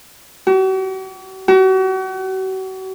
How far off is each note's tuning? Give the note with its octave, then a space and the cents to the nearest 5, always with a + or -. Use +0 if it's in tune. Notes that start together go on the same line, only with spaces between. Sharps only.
F#4 +45
F#4 +40